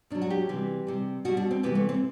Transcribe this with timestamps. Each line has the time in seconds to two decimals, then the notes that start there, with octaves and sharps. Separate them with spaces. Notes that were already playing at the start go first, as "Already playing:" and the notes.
0.10 B2 F#3 D4
0.22 F#4
0.30 G4
0.49 C3 E3 G3
0.87 C3 G3
1.25 B2 G3 F#4
1.37 D4
1.51 C4
1.63 C3 E3 G3 B3
1.75 A3
1.89 C4